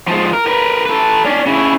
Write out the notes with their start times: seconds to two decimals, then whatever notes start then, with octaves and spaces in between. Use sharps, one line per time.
0.08 F3 G#3
0.33 A#4
0.47 A#4 B4
0.86 A4 B4
1.25 C#4 D4
1.46 C#3 E4